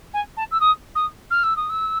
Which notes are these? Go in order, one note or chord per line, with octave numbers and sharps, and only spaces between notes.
G#5
A5
E6
D#6
D#6
F6
E6
D#6
E6